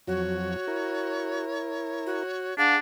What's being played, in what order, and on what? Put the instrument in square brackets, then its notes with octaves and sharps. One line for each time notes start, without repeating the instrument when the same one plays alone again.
[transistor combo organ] F2 F#3 [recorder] F#4 [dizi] C#5
[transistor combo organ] E4 A#4
[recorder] F#4
[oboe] D4 [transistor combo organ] G#4 [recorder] F5 [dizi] F#5